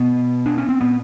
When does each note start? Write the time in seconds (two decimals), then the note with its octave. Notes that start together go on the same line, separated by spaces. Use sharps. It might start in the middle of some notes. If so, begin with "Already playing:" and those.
Already playing: B2 B3
0.46 D4
0.58 C#4
0.69 C4
0.81 A#2 B3